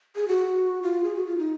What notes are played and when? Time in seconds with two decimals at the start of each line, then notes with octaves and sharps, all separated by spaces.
0.16 G#4
0.28 F#4
0.83 F4
1.04 G#4
1.15 F#4
1.27 F4
1.38 D#4